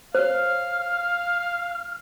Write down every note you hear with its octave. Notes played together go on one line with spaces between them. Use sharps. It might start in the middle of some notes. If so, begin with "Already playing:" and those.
C5 C#5 F5 F6